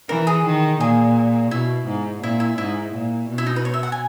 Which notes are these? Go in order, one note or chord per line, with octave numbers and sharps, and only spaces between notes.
E3 A#4
G#4
D#3
A#2 G#4
B2 E4
G#2
A#2 E4
E4
G#2 E4
A#2
B2
E4
D#4
B4
C#5
E5
F#5
G#5